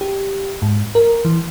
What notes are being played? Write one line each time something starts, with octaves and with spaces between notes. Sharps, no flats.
G4
G#2
A#4
E3